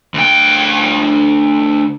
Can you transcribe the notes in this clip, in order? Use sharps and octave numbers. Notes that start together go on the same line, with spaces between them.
D2 G5